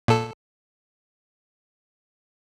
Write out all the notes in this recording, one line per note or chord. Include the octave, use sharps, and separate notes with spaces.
A#2 A4